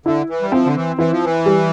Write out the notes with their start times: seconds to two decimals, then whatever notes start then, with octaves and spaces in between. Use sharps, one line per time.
0.06 D3 E4
0.30 E3
0.42 G3
0.52 F3 C4
0.66 D3
0.76 E3
0.99 E3 E4
1.12 F3
1.25 E3
1.46 G3